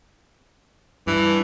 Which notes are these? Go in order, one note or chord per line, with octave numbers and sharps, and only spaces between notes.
G2 E3